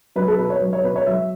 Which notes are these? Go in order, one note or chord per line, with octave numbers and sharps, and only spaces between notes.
F#3 B4
A4
B2 B4
C#5
F#3 B4
C#5
B2 B4
C#5
F#3 E5